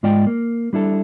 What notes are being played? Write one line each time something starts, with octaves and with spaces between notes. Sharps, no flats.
G#2 G#3 F4 D5 D#5 G5
A#3
G3 D4 E4 A4